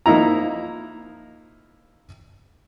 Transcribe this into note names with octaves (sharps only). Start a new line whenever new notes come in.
F3 A#3 D#4 E4 A#5